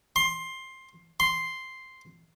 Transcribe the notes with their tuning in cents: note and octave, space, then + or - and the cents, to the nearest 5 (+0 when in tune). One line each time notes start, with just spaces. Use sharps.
C6 +15
C6 +0